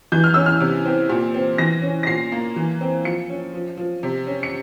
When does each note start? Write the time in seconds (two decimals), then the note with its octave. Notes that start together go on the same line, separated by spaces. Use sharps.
0.12 E3 G6
0.24 F6
0.34 C#4 E6
0.46 F6
0.60 C3
0.86 C4
1.10 A#2
1.34 C4
1.58 E3 A#6
1.82 C#4
2.03 A#6
2.07 A#2 C7
2.32 A#3
2.56 E3
2.81 C4
3.04 F3 C#7
3.29 C#4
3.54 F3
3.77 F3
4.03 C3
4.27 C#4
4.43 C#7